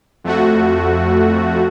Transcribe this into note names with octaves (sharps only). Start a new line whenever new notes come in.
F2 A3 F#4